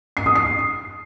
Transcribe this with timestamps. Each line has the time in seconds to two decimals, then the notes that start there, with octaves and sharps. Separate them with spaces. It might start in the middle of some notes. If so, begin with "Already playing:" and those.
0.17 C7
0.26 D#6
0.35 C7